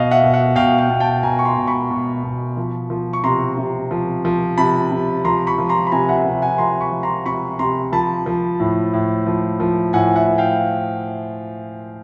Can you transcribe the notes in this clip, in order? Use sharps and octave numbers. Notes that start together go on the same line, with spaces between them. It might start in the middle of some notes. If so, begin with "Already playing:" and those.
Already playing: B2 D#5 F5
E5 F#5
B2
E5 F#5
B2 F5 G5
F5 G5
B2
G5 A5
B2 G#5 A#5
C#6
A#5 C6
B2
B5 C#6
B2
B2
F3
F3
C#6
C3 A#5 C6
C3
F3
F3
C3 A5 B5
C3
F3 A#5 C6
B5 C#6
F3
A#5 C6
B5
C3 G#5 A#5
E5 F#5
C3
F#5 G#5
F3 A#5 C6
B5 C#6
F3
A#5 C6
C3 B5 C#6
C3 A#5 C6
F3 A5 B5
F3
A2
A2
F3
F3
A2 F#5 G#5
E5 F#5
A2
F5 G5